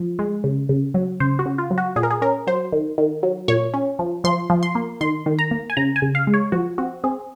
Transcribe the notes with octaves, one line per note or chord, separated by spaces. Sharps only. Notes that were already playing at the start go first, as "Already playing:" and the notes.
Already playing: F3
G#3
C#3
C#3
F#3
C#3 C5
F#4
C#3
F4
F#3
F#4
A#2 G#4
A#4
G#4
C#4 A#4
F#3 C5
D#3
D#3
F#3
A#2 C#5
C#4
F3
F3 C6
F3
C6
A#3
D#3 C6
D#3
A#5
A#3
G#5
C#3 A#5
G#5
C#3
F5
G#3
C#5
F3 F#4
C4 F#4
C4 G#4